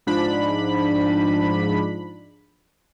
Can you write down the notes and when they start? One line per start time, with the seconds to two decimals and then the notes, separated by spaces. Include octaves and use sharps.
0.07 G#2 F3 D4 B5